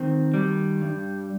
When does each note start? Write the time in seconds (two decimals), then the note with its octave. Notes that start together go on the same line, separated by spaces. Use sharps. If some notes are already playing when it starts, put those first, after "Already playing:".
Already playing: D#3 C4
0.34 G3
0.82 G2